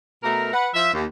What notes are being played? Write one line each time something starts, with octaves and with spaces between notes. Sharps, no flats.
B2 A3 A#4
B4 F#5
F3 E5
D#2